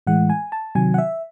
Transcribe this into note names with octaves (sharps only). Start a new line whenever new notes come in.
A2 E3 G#3 F#5
G#5
A5
C3 D#3 F#3 G#5
F#5
E5